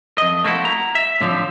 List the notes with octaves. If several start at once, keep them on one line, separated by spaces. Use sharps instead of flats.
F2 D#5
A3 A#3 C4 E4 F#4
A#5
E5
A2 D3 F3 C4